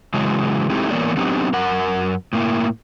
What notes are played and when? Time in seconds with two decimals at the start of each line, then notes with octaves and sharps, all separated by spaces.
0.14 C#3 E3 F#3 G#3
0.70 G#3 A3 C4 D#4 E4 G4
0.91 E3 A#3 B3 A#4 C#5 D5
1.17 F#3 B3 C4 D4 D#4 G4
1.53 F#2 A#4 F#5
2.33 A2 A#3 E4